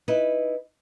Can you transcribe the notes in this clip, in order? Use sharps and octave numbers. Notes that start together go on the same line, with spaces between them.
D#4 E4 B4